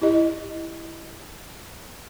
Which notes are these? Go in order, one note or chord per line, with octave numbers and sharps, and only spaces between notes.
E4 G4 D#5